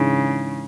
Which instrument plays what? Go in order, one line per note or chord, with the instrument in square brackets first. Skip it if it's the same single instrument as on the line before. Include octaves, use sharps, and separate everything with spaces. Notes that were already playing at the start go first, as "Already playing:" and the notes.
Already playing: [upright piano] G#2 E3 G#3 D4 [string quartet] C#3